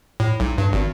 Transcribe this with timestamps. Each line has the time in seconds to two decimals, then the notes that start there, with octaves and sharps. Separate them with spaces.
0.20 A2
0.40 B1
0.58 G2
0.73 G#1